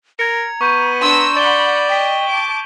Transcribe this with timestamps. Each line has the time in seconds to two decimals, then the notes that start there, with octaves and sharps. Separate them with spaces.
0.19 A#4 A#5 G#6 C#7
0.61 B3 C#6 G6 D#7
1.00 D4 A#5 C6 E6
1.37 D5 F#5 B5 E7 G7
1.89 D#5 G5 D#6 B6
2.28 A5 D6